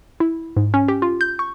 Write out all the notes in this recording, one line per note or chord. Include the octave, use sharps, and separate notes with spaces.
E4
G#2
C#4
G4
F4
G6
C#6